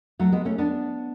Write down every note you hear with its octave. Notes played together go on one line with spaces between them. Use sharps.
F#3 A3
G#3 B3
A3 C#4
B3 D4